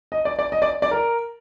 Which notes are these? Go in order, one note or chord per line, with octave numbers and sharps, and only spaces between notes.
D#5
D5
D5
D#5
D5
D5
A#4